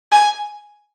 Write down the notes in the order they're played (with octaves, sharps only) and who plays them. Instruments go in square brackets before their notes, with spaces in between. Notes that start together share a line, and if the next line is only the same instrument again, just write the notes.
[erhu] G#5